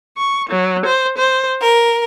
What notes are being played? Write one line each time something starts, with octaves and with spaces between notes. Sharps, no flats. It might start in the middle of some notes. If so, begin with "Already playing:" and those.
C#6
F#3
C5
C5
A#4